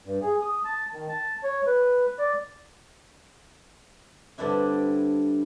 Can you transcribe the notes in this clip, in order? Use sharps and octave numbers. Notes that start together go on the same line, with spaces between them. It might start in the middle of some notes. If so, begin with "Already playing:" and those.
G2
G#4
D#6
A5
D#3
A5
C#5
B4
D5
G2 D3 C4 D4 E4